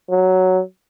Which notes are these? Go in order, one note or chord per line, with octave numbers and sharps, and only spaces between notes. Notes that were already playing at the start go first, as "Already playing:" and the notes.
F#3